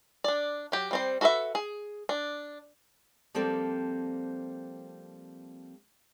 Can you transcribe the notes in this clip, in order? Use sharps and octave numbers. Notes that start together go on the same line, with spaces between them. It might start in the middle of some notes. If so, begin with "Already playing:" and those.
D4 D5
F#3 G4
G3 C4 C5
F#4 A4 B4 D#5 E5
G#4
D4
F3 G3 A#3 C4 A4